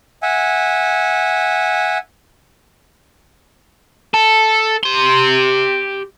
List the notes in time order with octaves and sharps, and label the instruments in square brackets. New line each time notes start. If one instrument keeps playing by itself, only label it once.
[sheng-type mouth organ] E5 F#5 G#5
[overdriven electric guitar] A4
G4 C6